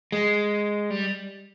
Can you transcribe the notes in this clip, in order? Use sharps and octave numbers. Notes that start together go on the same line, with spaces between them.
G#3
G3